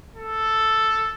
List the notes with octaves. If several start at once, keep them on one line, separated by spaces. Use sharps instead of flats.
A4